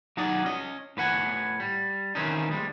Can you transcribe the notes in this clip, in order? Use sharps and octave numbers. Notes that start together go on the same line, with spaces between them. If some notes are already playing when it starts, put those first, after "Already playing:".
F#3 D#4 F#4 G#4 D5
C#4 D#5
A2 B4 F#5 G#5
G3
D#3 E3 C4 C#4 D#4
D2 G3 G#3